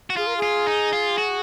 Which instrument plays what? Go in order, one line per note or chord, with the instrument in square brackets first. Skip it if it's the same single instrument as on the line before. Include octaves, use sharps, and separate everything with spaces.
[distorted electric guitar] F#4
[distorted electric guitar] F4 [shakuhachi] G#4
[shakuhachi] A#4
G#4
[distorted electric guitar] F4
D#4
F4
F#4